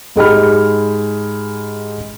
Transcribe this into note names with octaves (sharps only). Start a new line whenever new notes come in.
G#2 G#3 G4 B5 F6